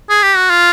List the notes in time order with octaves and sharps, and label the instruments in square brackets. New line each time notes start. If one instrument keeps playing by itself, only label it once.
[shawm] G#4
G4
F#4
F4